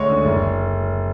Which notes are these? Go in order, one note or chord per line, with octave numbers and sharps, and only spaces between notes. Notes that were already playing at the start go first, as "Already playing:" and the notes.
Already playing: D2 G#3 C#5
D3
F#1